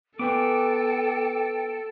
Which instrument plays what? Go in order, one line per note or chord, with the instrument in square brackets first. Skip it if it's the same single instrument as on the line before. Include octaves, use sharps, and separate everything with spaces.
[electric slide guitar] B3 B4 G#5 [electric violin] A4 [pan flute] G5 [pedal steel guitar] D6